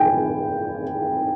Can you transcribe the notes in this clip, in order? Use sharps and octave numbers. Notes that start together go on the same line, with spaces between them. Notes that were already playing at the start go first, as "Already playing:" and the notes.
Already playing: G5 G#5